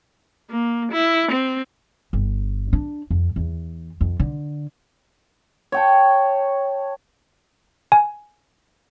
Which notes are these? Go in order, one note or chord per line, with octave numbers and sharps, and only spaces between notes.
A#3
E4
C4
G1
D4
F2
E2
F2
D3
C#5 G5 A5
G#5